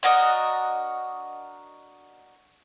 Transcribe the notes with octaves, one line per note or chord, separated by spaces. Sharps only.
D4 F#4 A#4 D#5